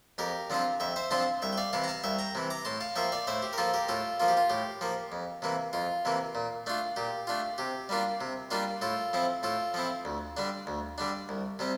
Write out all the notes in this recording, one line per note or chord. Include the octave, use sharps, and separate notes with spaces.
F2 G4 A#4
D3 F3 C4 F4
F2 E5 G5
C5 E5
D3 F3 C4 F4 A5 C6
C2 E5 G5
G5
D5 F5
C3 E3 F5 A5
A#5
F5 A5
C2 E5 G5
G5 A#5
C3 E3
A#5 D6
A2 A5 C6
F5 A5
F3 A#3 F4 E5 G5
D5 F5
A2 C5 E5
G4
A#4
F3 A#3 F4 A4
G4 A#4
A2 F4 A4
F3 A#3 F4
G4
F4
A2 G4
F3 A#3
F2
C3 E3 A#3
F2 F4
C3 E3 A#3
A#2
A3 D4 F4
A#2 G4
A3 D4 F4
C3 G4
G3 A#3 D4 F4
C3
G3 A#3 D4 F4
A2 F4 A4
F3 C4 E4
A2 F4 A4
F3 C4 E4
D2
D3 G3 D4
D2
D3 G3 D4
C2
C3 G3 C4